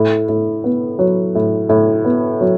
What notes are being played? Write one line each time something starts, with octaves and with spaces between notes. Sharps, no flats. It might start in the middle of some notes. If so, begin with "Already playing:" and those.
Already playing: A2
A2
B3
F#3
A2
A2
B3
F#3